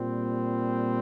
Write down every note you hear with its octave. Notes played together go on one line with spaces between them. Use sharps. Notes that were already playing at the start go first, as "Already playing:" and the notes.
Already playing: A#2 G3 C4